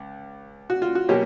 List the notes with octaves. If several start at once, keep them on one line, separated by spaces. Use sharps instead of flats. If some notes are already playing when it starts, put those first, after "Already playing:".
Already playing: C#2
F#4
F4
F#4
B2 F#3 A#3 C#4 G4